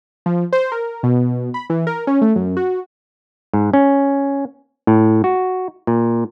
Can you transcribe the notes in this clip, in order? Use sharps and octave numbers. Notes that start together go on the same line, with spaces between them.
F3
C5
A#4
B2
B5
E3
A#4
C#4
A3
F#2
F#4
G#2
C#4
A2
F#4
A#2